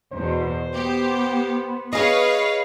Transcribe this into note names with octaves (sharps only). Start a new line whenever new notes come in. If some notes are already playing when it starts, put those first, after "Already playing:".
E2 B2 C5
B3 G4
G#4 B4 C#5 D#5 F5